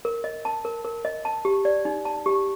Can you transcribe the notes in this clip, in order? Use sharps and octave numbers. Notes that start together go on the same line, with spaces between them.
A#4
D#5
A5
A#4
A#4
D#5
A5
G4
D5
D#4
A5
G4